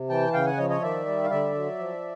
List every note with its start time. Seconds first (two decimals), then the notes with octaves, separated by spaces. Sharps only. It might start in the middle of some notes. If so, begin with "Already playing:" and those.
Already playing: C3
0.09 E3 G5 A5
0.33 C#3 F5 G5
0.46 F#5 G#5
0.58 F3 C#5 D#5
0.69 C#5 D#5
0.82 D#3 D5 E5
1.06 G3
1.24 F5
1.30 D3 D5 E5
1.55 F#3
1.78 F3